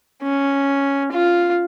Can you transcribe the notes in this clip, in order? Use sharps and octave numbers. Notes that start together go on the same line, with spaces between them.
C#4
F4